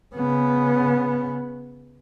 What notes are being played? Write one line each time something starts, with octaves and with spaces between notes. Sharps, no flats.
C#3 B3